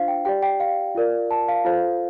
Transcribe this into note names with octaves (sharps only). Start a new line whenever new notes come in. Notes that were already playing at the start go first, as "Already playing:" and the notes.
Already playing: D4 F4 C5 F5
G5
G4 D5 G5
G5
F5
F4 A#4 D5
A5
F5
F4 A4 C5 F5